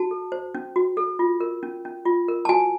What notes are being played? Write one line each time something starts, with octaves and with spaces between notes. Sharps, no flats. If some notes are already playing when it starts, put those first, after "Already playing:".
Already playing: F#4 A5
A4
C5
C#4
F#4
A4
F4
A#4
C#4
C#4
F4
A#4
A5
F#4 G#5